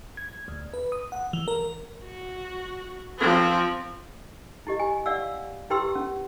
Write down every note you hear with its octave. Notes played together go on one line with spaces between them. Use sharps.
G#6
D2
B4
D#6
F#5
E3
A#4
F#4
F3 C4
E4 G4 D#5
G#5
D5 F5 F#5 E6
E4 G4 B4 G5 C6 E6
C#4